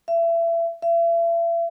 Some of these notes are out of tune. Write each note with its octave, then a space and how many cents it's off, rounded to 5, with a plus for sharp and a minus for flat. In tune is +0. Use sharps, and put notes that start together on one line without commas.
E5 +30
E5 +40